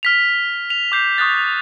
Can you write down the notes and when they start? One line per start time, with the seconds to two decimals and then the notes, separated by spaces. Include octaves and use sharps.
0.03 F6 B6 F7
0.70 F7
0.92 D6 G6 C7
1.18 C#6 D#6 F#6 A6